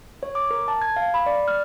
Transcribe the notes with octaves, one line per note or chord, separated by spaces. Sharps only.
C#5
D6
A#4
A5
G#6
F5
B5
D5
F6